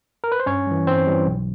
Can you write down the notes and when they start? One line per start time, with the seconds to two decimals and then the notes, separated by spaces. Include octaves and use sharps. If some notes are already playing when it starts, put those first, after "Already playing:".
0.24 A#4
0.32 B4
0.40 C5
0.46 G2 C#4 C#5
0.67 E3 G3
0.86 G2 C4 C5
1.07 E3 G3
1.27 B1